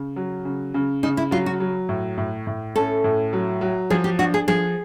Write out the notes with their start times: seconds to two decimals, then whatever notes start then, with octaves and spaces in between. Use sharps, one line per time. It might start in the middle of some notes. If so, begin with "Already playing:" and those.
Already playing: C#3
0.16 F#3
0.45 C#3
0.74 C#3
1.03 C#3 D#4
1.17 E4
1.31 F#3 F4
1.46 F#4
1.60 F#3
1.89 A2
2.17 A2
2.47 A2
2.76 C#4 A4
3.04 A2
3.33 F#3
3.61 F#3
3.90 F3 G#4
4.04 G4
4.19 D4 F#4
4.34 G#4
4.48 F3 G#4